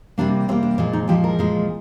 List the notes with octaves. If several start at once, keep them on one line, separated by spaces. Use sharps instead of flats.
C3 G3 A#3 D4
C3 G3 A#3 C4
D4
A#2 F3 G#3
D#4
A#2 F3 G#3 G4
A#4
A#2 F3 G#3